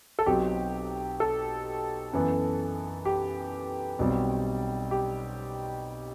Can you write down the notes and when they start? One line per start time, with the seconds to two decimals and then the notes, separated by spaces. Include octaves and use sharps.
0.19 A4
0.26 B1 B2 F#3 C4 G4
1.20 A4
2.13 F#2 E3 B3
3.05 G4
3.99 B1 B2 G3 C4
4.91 G4